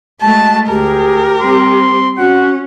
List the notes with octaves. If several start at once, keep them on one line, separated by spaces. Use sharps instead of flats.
G#3 A3 F#4 A5
D2 G4 G#4 A#4
G3 C4 C6
C#4 F#4 F#5